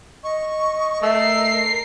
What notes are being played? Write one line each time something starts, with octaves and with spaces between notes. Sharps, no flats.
D#5 C#6
A3 A#4 E6 C7